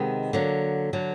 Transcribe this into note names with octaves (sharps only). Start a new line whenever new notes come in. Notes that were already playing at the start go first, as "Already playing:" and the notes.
Already playing: C3 D#3 G#3 B3
D3 F#3 A#3
D3 F#3